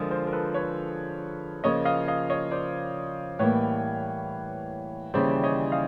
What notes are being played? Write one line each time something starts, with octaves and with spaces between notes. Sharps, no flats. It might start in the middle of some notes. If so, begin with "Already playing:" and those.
Already playing: D3 F3 G#3 G#4 A#4
A#4 C5
A#4
A4 B4
B4 C#5
C#3 F3 A#3 C#5 D#5
D#5 F5
D#5 F5
C#5 D#5
C5 D5
A2 E3 G3 A#3 B4 C#5
D#2 C#3 E3 G3 C5 D5
C#5 D#5
D#5 F5